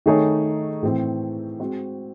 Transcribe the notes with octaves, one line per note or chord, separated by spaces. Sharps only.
D#3 A3 D#4 G#4 C#5
A2 E3 C4
G#3 C4 F#4 C5